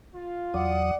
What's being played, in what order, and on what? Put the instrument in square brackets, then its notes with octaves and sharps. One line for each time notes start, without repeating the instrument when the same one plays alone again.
[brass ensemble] F4
[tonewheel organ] E2 F#3 D#6 [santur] D5 [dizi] F#5